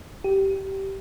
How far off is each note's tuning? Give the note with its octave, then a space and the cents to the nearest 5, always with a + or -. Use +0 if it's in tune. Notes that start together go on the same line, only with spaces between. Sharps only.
G4 -15